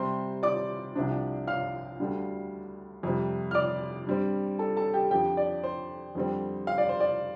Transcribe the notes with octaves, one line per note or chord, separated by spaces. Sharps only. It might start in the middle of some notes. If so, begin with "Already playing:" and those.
Already playing: C3 G3 C4 C5 C6
D5 D6
C2 C3 F3 D4
F5 F6
D2 D3 G3 D4
F2 C3 G3 C4
F6
D5 D6
G2 G3 C4
A4 A5
A4 A5
G4 G5
F2 D3 F3 G4 G5
D5
C5
F2 D3 G3 C4
F5
D5
C5
D5